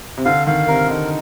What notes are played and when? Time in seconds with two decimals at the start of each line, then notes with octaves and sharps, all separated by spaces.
0.18 C3
0.25 D3 F5
0.46 D#3 F5
0.68 C3 A#4
0.88 D3 D#4